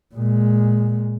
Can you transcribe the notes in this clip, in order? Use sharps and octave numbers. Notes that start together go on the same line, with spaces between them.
A#2 G#3